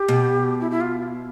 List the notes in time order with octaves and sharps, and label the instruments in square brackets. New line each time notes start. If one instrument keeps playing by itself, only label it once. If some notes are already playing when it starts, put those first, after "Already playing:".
Already playing: [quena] G4
[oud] B2
[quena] E4
E4
F4